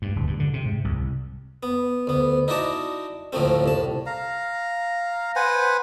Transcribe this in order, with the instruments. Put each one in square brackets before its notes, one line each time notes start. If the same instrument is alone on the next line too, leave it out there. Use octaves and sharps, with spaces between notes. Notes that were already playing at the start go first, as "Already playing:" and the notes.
[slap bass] G2
D1
G2
D3
C3
G#2
C2
[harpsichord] B3
D2 B3
D#4 E4 F#4 D5 A5
D2 A2 F3 F#3 A3 C4
C2 A2 A5
[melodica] F5 A#5
B4 C5 F#5 G#5